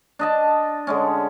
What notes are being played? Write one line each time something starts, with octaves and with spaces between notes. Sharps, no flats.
D4 D#5 A5
D3 G#3 C#4